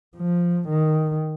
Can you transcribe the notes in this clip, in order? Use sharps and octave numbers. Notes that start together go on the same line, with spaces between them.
F3
D#3